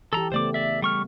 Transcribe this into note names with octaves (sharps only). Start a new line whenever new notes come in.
E3 G4 A4 A#5
C#3 A3 B3 C5 D5 D6
D5 E5
G3 C#6 F6